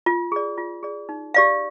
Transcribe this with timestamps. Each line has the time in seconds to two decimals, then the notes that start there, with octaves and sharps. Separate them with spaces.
0.06 F4
0.32 G#4 D5
0.57 F4
0.83 G#4 D5
1.09 D#4
1.34 G4 D5 F5